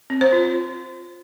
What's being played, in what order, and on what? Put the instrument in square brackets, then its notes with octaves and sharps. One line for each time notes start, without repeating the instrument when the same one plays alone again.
[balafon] C4
C5
F4